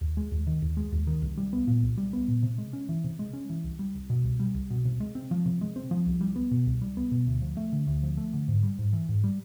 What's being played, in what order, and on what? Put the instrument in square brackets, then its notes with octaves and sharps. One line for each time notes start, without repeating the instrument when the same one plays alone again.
[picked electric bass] D#2
G#3
D#2
D#3
D#2
G#3
D#2
D#3
C2
G3
B3
A#2
C2
G3
B3
A#2
C3
G#3
C#4
E3
C3
G#3
C#4
E3
C2
G3
C2
B2
C2
G3
C2
B2
C3
G#3
C4
F3
C3
G#3
C4
F3
C2
G3
B3
B2
C2
G3
B3
B2
D2
F3
A3
D3
D2
F3
A3
D3
G#2
G3
G#2
E3
G#2
G3